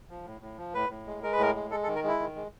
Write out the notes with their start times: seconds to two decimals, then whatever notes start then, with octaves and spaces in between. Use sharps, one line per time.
0.10 F3
0.26 A2
0.41 A2
0.58 F3
0.74 A2 B4
0.90 A2
1.07 G#3
1.23 G#3 A#4
1.32 B4
1.38 A2 A#4
1.55 G#3
1.71 G#3 A4
1.83 A4
1.87 D#3
1.95 A#4
2.04 G#3 E4
2.20 D#3
2.36 G#3